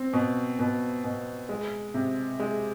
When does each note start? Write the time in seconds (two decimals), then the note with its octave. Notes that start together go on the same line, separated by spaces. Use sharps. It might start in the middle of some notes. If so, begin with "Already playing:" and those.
Already playing: C4
0.13 B2
0.59 B2
1.04 B2
1.49 G#3
1.94 C3
2.40 G#3